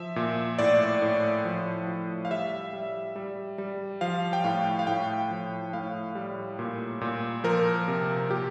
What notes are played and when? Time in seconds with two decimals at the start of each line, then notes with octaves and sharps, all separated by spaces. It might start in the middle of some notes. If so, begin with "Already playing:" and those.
Already playing: F3 E5
0.16 A#2
0.59 A2 D5
1.02 A2
1.45 F3
1.87 F3
2.25 F5
2.31 G3 E5
2.73 G3
3.16 G3
3.58 G3
4.01 F3 F5
4.33 G5
4.44 A2 F5
4.79 F5
4.87 A2 G5
5.31 F3
5.73 A2 F5
6.15 G3
6.59 A#2
7.01 A#2
7.44 F3 A#4
7.88 C3
8.29 A#2 G4